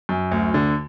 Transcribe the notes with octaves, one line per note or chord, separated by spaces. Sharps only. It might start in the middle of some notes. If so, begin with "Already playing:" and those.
F#2
D2
D3